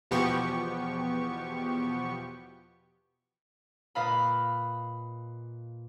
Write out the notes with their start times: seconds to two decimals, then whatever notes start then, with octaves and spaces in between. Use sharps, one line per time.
0.11 E2 B2 F3 B3 G4 C#6
3.95 A#2 B4 D#5 F5 B5